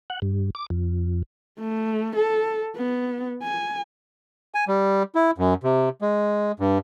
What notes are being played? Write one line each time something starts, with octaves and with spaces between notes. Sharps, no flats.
F#5
G2
D6
F2
A3
A4
B3
G#5
G#5
G3
E4
F#2
C3
G#3
G2